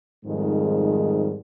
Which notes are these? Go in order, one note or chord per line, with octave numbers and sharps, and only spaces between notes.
F2 G#2 D#3 G3 G#3